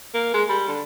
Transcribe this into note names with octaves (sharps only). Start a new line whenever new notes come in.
A#3
G#3
G3
D3